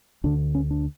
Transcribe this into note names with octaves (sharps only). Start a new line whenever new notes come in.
D2 D3 D4
C#4
D4